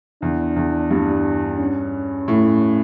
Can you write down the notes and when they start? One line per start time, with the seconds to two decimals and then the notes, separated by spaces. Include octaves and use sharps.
0.22 E2 D4
0.56 E2
0.91 G2
1.59 C#4
2.28 A2